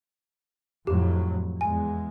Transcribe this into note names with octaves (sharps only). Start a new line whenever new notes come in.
F2 A2 F#3 G4
E2 G#3 G#5